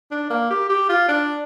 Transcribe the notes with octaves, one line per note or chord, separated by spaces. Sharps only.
D4
A#3
G4
G4
F4
D4